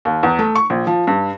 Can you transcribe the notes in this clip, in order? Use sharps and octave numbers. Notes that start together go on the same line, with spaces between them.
D#2
E2
A3
C#6
A#1
F3
G2